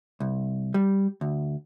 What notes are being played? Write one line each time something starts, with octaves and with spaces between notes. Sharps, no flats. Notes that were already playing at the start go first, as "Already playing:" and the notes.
C2
G3
D2